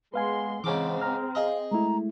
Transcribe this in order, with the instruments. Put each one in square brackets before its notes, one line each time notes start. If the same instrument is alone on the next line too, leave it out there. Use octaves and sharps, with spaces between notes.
[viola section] G#3 C6 [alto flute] B3 [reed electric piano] B4 F5 G#5
[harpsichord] G#2 C#3 D6 [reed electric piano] E3 C#5 [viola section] C4 [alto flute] G#4
[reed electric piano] A#5 F6
[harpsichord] G#4 D#5 [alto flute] F5
[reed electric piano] G#3 A3 E4 [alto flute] A#5